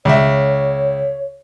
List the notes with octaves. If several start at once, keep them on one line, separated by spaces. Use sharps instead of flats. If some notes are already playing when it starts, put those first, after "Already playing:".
C#2 C#5 E5